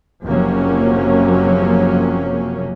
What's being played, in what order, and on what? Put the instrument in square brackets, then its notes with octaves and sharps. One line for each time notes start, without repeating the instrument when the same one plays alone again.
[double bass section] F#1 C3 F3 F#3 A#3 C#4